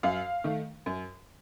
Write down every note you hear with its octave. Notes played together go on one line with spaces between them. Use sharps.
F#2 F5
D#3 A3
F#2